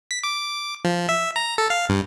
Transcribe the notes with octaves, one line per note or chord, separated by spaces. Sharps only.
B6
D6
F3
E5
A#5
A4
F5
G2